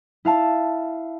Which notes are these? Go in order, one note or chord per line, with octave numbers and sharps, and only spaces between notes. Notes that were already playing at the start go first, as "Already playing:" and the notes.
E4 F5 A5